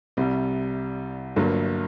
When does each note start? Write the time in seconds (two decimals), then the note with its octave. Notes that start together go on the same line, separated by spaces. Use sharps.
0.17 C2 C3 G3
1.36 G1 G2 F#3 A#3